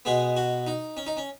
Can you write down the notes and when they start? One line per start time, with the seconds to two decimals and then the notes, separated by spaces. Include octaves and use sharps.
0.05 B2 G#3 B3 G#4
0.37 F#4
0.67 D#4
0.97 C#4
1.07 D#4
1.17 C#4